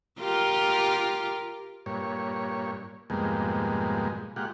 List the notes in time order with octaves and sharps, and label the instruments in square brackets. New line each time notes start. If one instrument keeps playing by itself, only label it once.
[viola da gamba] F4 G4 A#4
[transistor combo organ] G2 A#2 C#5
F2 G#2 B2 G3 G#3 A#3
A#2 G#3 F4 G4 F#5